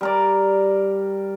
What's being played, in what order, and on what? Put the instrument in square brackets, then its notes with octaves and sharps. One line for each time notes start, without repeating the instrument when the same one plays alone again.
[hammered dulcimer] G3 A#4 D5